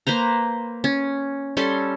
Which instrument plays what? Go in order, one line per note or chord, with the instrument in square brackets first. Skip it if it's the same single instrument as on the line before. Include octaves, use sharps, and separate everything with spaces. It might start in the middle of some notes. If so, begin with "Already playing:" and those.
[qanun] A#3 B4 C5 A#5
C#4
G3 C#4 A4 C6